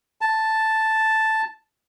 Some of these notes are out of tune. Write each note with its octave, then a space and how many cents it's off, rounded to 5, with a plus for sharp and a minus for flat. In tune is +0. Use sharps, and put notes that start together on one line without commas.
A5 +0